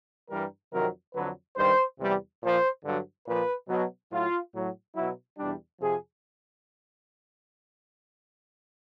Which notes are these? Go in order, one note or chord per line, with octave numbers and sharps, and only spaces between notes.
G2 E3 G3 A#4
F2 C3 D#3 F#3 A#4
F2 D3 F#3 B4
G2 D#3 G3 C5
E2 C3 E3 G3
A#2 F3 C5
G2 D3 F#3
A#2 F3 B4
B2 F#3
A2 F#3 F4
A2 F#3
B2 F#3 E4
E2 B2 G3 D4
F2 C3 F3 G#4